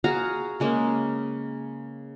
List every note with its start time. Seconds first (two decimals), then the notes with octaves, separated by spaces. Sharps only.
0.04 F#4 G#4 F5 A#5
0.60 C#3 G#3 A#3 C#4